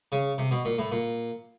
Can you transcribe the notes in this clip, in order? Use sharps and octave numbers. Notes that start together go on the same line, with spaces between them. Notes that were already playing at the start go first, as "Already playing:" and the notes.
C#3
C3
B2
A#2
A2
A#2